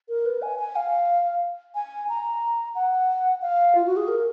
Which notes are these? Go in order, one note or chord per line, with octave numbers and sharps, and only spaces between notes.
A#4
B4
G#5
G#5
F5
G#5
A#5
F#5
F5
F4
F#4
G#4
A#4